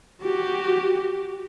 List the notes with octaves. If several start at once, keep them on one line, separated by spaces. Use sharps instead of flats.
F#4 G4